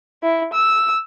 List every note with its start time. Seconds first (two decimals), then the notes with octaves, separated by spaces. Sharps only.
0.23 E4
0.53 E6